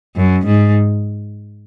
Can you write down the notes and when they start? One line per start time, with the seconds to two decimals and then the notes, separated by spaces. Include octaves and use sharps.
0.16 F#2
0.46 G#2